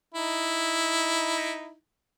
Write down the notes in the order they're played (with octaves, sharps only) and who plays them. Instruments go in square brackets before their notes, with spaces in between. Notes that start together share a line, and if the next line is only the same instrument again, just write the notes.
[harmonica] D#4 E4